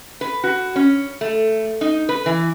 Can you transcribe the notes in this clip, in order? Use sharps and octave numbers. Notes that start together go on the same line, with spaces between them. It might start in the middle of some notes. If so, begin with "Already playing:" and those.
B4
F#4
C#4
A3
D#4
B4
E3